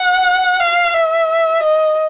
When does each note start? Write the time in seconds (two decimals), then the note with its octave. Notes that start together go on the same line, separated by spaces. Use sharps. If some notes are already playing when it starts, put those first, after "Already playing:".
Already playing: F#5
0.60 F5
0.94 E5
1.62 D#5